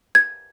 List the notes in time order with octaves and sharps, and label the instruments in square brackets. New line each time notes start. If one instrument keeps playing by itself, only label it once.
[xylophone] G#6